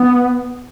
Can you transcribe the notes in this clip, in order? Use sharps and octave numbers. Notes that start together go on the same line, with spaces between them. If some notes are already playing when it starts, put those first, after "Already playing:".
Already playing: B3